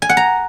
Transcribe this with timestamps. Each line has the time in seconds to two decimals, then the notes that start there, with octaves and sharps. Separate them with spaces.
0.02 G#5
0.09 F#5
0.17 A#5